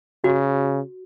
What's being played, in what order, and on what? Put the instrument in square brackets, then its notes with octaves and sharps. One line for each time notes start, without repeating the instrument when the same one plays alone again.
[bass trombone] C#3 [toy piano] F#4